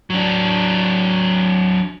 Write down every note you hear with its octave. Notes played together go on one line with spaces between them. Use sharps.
F#3 D4